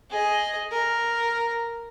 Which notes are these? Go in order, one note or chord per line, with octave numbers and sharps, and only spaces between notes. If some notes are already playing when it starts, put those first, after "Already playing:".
G#4 D#5
A#4